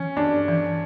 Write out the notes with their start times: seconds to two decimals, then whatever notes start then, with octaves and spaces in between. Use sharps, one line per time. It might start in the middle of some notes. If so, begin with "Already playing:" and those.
Already playing: E3 C#4
0.17 G2 D4
0.48 E3